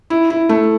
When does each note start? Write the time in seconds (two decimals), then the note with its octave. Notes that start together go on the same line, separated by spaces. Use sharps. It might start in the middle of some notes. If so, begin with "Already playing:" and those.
0.10 E4
0.30 E4
0.49 A3